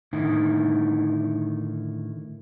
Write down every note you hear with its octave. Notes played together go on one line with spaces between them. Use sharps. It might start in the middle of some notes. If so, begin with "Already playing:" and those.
A2 D3 D#3 D#4 E4